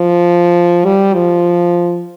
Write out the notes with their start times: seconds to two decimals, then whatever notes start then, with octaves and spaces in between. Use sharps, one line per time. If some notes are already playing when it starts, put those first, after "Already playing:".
Already playing: F3
0.85 G3
1.14 F3